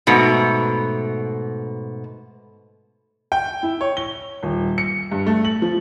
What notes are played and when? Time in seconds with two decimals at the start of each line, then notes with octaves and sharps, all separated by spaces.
0.07 G#2 B2 A3
3.32 G5
3.63 E4
3.81 C#5
3.97 G7
4.43 D#1
4.78 C#7
5.12 G2
5.27 A3
5.45 F#7
5.62 F3